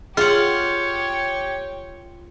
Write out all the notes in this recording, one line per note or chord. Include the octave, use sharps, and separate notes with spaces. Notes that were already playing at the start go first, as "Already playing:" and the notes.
F4 G4 G#4 C#5 F#5